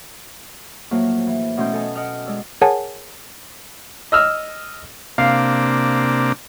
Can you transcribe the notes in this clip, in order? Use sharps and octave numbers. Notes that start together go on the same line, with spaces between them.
A2 F3 F#3 A#3
E3
B2 A3 C#4 G5 C6 G6
A4 D#5 G#5 A5
D#5 F#5 G5 D#6 F6
G#3 D5 E6
G#4 A#4 C#5 F#5 G#5 A5
D#5 E6 F6
C3 A#3 D4 F5